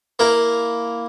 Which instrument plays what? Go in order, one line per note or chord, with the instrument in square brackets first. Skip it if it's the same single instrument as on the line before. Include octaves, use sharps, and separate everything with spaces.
[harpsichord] A#3 E4 A#4